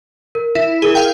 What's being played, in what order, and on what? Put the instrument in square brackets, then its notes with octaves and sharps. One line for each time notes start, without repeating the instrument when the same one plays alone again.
[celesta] A#4
[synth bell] E4 [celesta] E5
[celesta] E4 A#4 G7 [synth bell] G#4
[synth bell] F5 G5